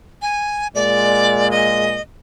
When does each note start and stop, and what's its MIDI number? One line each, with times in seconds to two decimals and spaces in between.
0.22 0.67 80
0.75 1.98 46
0.75 1.98 56
0.75 1.50 74
1.51 2.01 75